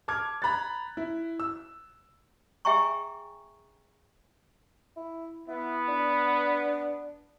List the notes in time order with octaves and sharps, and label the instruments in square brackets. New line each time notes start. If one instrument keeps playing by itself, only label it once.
[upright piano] A5 D6 F6 G#6
A#5 B5 F#6 A6
E4
E6
[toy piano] G#4 E5 G5 G#5 A#5 C#6
[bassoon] E4
[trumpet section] B3 [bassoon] E4
[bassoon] D4